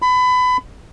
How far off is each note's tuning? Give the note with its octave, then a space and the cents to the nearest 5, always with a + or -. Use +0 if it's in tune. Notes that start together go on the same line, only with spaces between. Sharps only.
B5 +25